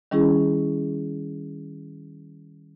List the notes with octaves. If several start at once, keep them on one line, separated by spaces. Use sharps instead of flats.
D#3 G3 C#4 E4 G#4